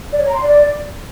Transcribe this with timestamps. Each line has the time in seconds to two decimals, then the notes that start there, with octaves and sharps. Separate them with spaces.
0.11 D5
0.19 C#5
0.27 A#5
0.34 C6
0.42 D5